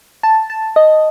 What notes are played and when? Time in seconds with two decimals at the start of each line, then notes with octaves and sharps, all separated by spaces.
0.23 A5
0.50 A5
0.76 D#5